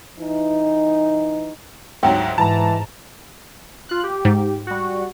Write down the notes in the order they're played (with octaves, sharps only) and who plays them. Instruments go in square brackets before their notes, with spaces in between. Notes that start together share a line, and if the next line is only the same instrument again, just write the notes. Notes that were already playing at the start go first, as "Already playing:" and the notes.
[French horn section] E3 D#4
[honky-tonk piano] D2 G#2 F#3 [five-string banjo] C4 F#4 G4
[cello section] G#2 [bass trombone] E3 [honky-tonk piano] A5 A#5
[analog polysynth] F4 F#6
G4
[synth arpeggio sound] G#2
[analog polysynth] G3 F#4